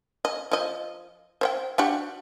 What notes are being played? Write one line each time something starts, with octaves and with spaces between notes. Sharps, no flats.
D#5
F3 D#5
C5 C#5 G5
D4 F#4 G4